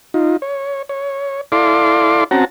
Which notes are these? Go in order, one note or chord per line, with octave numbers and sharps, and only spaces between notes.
D#4 F4
C#5
C#5
E4 A4 D5 F5 C6 D6
C4 C#4 F#4 F#5 A5 A#5